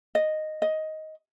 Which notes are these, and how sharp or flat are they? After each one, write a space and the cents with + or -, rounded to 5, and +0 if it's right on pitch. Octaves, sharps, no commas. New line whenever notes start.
D#5 -5
D#5 +10